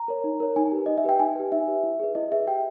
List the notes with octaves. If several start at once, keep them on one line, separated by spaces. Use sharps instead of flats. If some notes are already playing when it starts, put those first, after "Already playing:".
Already playing: A#5
A#4 C#5
D#4
A#4 C#5
D#4 G#5
G4 B4
D#4 D#5
E5
G4 B4 G5
D#4 G#5
G4 B4
D#4 E5
G4 B4
E4
G#4 B4
E4 D#5
G#4 B4 E5
G4 G5